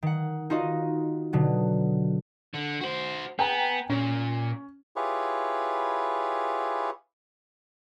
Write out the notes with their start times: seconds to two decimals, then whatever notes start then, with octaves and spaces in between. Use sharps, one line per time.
0.03 D#3 F#5
0.50 D#4 F4 F#4 D#5
1.33 B2 D3 F#3
2.54 D3
2.81 F#4 C5
3.39 B3 G5 G#5 A#5
3.90 A#2 C#4
4.96 E4 F4 G4 G#4 B4 C#5